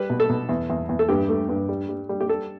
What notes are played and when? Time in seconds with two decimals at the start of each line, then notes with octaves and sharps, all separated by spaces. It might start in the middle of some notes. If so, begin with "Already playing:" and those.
Already playing: G3 B4
0.10 B2
0.20 A4
0.29 B2
0.49 E2
0.70 E2
0.89 E2
0.99 A4
1.09 G2 G4
1.29 A3
1.49 G2
1.69 G3
1.89 G3
2.09 G3
2.21 G4
2.28 G3 A4